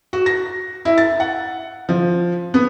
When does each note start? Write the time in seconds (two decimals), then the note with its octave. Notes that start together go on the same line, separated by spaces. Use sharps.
0.13 F#4
0.26 A#6
0.85 E4
0.98 A6
1.20 F#5
1.89 F3
2.54 B3